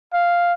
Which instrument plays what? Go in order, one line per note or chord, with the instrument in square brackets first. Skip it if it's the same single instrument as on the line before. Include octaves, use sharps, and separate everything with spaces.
[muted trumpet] F5